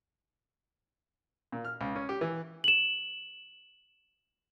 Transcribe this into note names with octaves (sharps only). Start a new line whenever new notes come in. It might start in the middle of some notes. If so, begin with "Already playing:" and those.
A#2
F6
C#2
C#4
G4
E3
E7 F#7